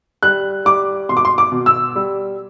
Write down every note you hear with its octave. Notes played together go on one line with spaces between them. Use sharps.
G3 F#6
G3 D6
B2 C6
D6
C6
D6
B2
E6
G3